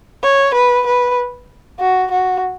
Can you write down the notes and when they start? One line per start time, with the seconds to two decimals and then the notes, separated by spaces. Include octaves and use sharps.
0.23 C#5
0.54 B4
0.86 B4
1.80 F#4
2.11 F#4